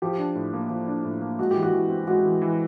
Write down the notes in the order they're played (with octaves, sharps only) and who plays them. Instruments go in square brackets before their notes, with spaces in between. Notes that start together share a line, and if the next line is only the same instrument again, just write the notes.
[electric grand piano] F3 [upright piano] G4
[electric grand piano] D4
A2
A#3
F3
D4
A2
A#3
[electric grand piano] G#3 [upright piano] F#4
[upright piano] G4
[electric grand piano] E3
[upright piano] F#4
[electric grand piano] E3
C4
[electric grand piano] G#3 [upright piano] F#4
[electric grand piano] E3
E3